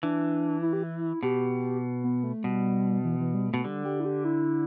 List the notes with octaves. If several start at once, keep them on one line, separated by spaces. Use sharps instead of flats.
E3 D4
E4
G4
E4
B2 G4
B3
A3
B2 G3
E3
E3
G3
B2 A3
D3 G3
G4
E4
G4
E4